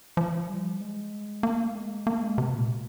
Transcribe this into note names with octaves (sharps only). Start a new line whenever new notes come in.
F3
G3
G#3
A#3
G#3
A#3
G#3
C3
A#2